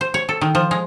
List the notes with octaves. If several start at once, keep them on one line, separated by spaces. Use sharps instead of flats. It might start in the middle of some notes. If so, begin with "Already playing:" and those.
C5
C#5
A4
D#3
F3
G#3